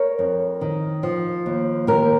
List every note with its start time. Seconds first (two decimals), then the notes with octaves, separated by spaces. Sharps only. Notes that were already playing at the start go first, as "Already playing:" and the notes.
Already playing: A#4 C#5
0.19 F2
0.61 D#3
1.03 F3
1.46 D#2
1.87 D#2 G4 A#4